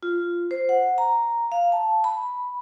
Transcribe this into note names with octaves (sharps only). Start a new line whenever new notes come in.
F4
C5
F#5
A#5
F5
A5
B5